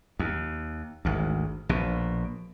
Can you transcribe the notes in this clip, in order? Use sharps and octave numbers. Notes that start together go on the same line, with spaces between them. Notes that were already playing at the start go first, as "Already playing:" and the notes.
D#2
G#1 D2
A#1 B2